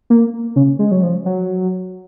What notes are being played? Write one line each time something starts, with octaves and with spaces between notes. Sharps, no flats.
A#3
C#3
G#3
F#3
F3
F#3